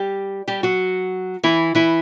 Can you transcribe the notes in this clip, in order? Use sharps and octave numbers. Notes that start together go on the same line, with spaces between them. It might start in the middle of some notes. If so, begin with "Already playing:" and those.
Already playing: G3 G4
G3 G4
F#3 F#4
E3 E4
E3 E4